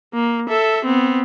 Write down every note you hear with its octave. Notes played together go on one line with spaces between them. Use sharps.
A#3
A4 E5
B3 C4